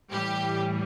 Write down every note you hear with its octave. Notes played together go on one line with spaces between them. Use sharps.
A2 E3 G3 G4